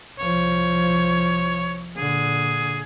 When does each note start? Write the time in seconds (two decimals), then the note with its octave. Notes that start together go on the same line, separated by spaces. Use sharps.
0.19 C2 F3 C#5
1.97 A#2 D3 G#4